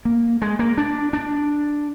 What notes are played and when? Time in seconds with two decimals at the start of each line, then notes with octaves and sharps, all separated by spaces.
0.05 A#3
0.42 G#3
0.59 A#3
0.78 D4
1.13 D4